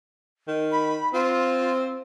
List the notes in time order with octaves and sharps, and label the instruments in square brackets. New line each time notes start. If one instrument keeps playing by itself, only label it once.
[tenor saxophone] D#3
[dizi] B5
[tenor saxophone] C4 [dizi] F4